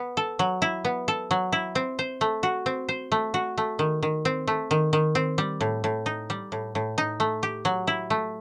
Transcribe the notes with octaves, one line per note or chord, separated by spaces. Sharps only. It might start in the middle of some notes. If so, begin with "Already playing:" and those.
Already playing: B3
A4
F#3
E4
B3
A4
F#3
E4
C4
C5
A3
F#4
C4
C5
A3
F#4
A3
D#3
D#3
C4
A3
D#3
D#3
C4
G3
A2
A2
D#4
G3
A2
A2
D#4
A3
G4
F#3
E4
A3